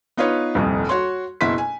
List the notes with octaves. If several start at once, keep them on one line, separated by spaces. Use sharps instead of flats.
B3 D#4 F4 B4 C#5
D#1 C2 F2
F#4 C#5 C6
F#1 B2 E4 C6 B6
G#5